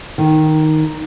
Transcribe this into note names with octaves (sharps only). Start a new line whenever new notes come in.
D#3